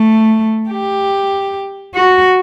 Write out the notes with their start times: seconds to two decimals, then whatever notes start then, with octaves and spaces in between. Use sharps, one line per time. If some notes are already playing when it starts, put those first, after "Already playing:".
Already playing: A3
0.70 G4
1.95 F#4